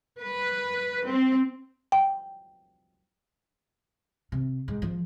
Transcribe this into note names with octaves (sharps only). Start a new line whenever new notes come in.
B4
C4
G5
C3
G#2
F3